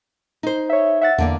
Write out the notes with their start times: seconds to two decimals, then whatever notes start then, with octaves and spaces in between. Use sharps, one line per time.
0.43 D#4 C5
0.70 C#5 E5
1.01 E5 F#5 A6
1.18 E2 D3 A#3 D5